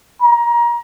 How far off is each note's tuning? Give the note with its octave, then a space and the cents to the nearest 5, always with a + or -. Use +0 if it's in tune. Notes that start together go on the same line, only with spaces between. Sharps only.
A#5 +25